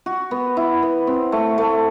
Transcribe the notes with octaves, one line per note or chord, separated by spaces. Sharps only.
F#4
B3
E4
B3
C4
A3
A3